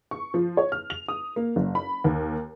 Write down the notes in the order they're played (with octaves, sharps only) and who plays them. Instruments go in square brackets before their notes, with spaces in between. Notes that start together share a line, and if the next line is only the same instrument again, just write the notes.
[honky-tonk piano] C#6
F3
C#5
F6
F7
D#6
A#3
F#1
B5
D#2